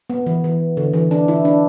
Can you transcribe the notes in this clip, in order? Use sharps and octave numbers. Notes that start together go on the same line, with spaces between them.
B3
E3
E3
D3
E3
D4
E4
D4